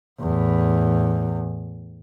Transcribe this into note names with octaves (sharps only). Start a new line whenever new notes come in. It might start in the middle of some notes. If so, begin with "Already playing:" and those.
E2 A2